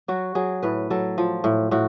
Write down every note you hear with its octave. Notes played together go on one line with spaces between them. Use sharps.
F#3 F#4
F#3 G#4
A2 B4
F#3 A4
F3
A2
A2 F#4